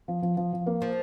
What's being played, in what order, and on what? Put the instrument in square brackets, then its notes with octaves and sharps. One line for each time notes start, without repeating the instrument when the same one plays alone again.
[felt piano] F3
F3
F3
F3
A#3
[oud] F3